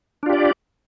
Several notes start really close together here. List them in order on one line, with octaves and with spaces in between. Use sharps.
D4 F4 G4 D5